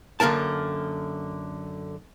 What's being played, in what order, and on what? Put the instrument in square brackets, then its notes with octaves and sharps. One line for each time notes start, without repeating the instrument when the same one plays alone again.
[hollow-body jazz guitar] F#2 D3 A#3 A#4 A5